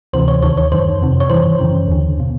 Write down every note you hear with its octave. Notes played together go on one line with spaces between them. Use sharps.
D2 C3 E3 C5
C#5
D#2 D#3 C#5
C#5
F#2 D#3 C5
F2 C3 D#3
C#5
G2 E3 C5
F#2 C#3 E3
D#2 D3
B2